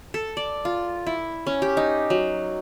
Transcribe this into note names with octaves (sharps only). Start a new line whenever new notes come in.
A4
D5
F4
E4
C#4
G4
D#4
F#3